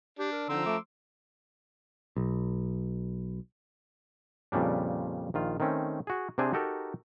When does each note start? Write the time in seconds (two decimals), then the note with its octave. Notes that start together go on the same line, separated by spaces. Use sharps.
0.19 D4 G4
0.32 A#4
0.49 D3 F3 D#4 A#5 C6 E6
0.66 A3 D6
2.16 B1
4.52 F2 A#2 C#3 G3 D4
5.34 A#1 D#3 F4
5.60 D#3 A3 C4 C#4
6.07 F#4 G#4
6.38 C3 C4 D4 G#4 C5 G#5
6.53 D#4 F#4 G4 A4 A#4